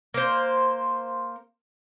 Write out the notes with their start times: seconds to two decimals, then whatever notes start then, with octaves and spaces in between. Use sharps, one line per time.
0.14 A#3 C5